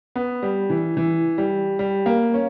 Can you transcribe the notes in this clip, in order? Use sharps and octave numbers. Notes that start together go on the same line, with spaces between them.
B3
G3
E3
E3
G3
G3
A#3
C#4